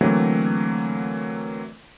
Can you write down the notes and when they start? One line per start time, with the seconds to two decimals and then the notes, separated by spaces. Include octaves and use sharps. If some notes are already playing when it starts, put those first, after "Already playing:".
0.01 D3 E3 F#3 A3 A#3 C4